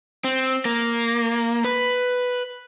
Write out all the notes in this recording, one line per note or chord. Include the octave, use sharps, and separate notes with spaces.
C4
A#3
B4